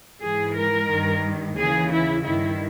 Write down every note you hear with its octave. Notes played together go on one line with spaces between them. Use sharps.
G#2 E3 G#4
A#4
G2 D#3
D#2 C#3 E3 G#4
E4
G2 D#3 E4